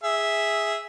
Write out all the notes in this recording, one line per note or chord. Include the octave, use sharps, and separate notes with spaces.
G#4 E5